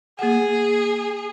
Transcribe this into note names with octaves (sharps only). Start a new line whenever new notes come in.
A#3 G#4 F#5